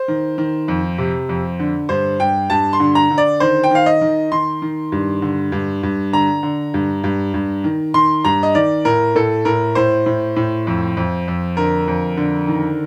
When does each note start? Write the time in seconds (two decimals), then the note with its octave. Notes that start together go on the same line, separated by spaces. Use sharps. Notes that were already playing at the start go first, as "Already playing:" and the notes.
Already playing: C5
0.08 D#3
0.38 D#3
0.68 F2
0.98 C3
1.29 F2
1.60 D3
1.89 G2 C5
2.20 G2 G5
2.50 G2 A5
2.73 C6
2.80 D3
2.95 A#5
3.11 D3
3.18 D5
3.40 D#3 C5
3.64 G5
3.71 D#3 F5
3.86 D#5
4.01 D#3
4.32 D#3 C6
4.62 D#3
4.92 G2
5.22 D3
5.52 G2
5.83 G2
6.13 D3 A#5
6.43 D3
6.74 G2
7.04 G2
7.34 G2
7.64 D#3
7.94 D#3 C6
8.25 G2 A#5
8.43 D#5
8.55 D#3 D5
8.85 A2 A#4
9.15 A2 A4
9.45 A2 A#4
9.75 A2 C5
10.06 A2
10.36 A2
10.67 F2
10.97 F2
11.28 F2
11.57 D3 A#4
11.88 F2
12.17 D3
12.48 D#3